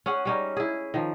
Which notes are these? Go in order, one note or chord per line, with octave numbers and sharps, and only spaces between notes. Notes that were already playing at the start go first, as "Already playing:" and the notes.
C#4 G#4 F#5
G3 C#4 D#4
E4 G#4
D#3 F3